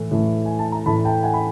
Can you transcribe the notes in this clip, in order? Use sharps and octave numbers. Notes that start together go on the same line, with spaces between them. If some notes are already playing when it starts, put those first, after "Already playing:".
Already playing: A2 E3 A3
A2 E3 A3
G#5
A5
A#5
A2 E3 A3 A5 B5
G5 A5
F#5 G#5
B5